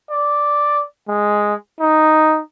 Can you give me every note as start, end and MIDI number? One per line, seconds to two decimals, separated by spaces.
0.11 0.82 74
1.08 1.54 56
1.80 2.41 63